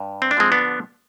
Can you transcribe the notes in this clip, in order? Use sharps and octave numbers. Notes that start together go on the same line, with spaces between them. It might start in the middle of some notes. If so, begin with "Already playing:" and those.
Already playing: G2
C4
D4
D3 F3 G#3 C4
B3 D4